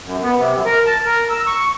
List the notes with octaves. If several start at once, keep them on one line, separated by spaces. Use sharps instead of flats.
F#2
B3
C3
F#2
A#4
A5
A#4
E6
C#6